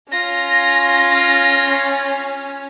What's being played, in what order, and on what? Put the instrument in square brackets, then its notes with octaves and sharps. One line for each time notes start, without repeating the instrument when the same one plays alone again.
[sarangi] C#4 [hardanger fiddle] F4 [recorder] A#6